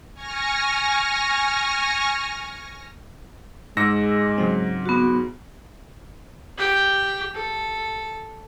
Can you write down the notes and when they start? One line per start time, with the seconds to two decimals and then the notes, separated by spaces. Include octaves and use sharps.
0.14 G#5 C#6 F6 A#6
3.77 G#2 G#3 D6 E6 A#6 C#7
4.38 C#3 F#3 C4
4.86 B3 F#4
6.58 G4 G5
7.34 A4